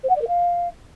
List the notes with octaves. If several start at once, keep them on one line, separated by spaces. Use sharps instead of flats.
C5
F#5
D5
A#4
F5